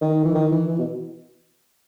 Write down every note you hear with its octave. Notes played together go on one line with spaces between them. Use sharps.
D#3
E3
D#3
E3
E3
B2